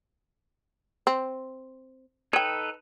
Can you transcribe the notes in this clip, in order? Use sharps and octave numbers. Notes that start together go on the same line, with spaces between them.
C4
D#4 A4 B4 C#5 G5